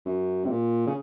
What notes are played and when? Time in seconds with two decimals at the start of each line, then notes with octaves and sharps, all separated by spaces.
0.06 F#2
0.45 C3
0.50 A#2
0.87 C#3